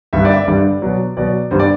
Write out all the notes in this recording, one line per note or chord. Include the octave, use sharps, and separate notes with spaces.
G2 D3 G3 E5
D5
E5
D5
G2 D3 G3 D5
B2 F#3
B2 F#3 D5
G2 D3 G3 C5
D5